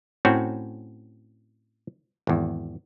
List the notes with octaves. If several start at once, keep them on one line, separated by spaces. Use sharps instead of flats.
A2 C4 C#4 F#4
G#1 E2